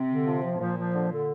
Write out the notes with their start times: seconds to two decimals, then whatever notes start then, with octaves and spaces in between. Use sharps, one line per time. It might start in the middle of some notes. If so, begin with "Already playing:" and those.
Already playing: C3
0.09 D3
0.25 F3
0.43 F3
0.59 A#2 F3
0.77 F3
0.94 D3
1.10 D3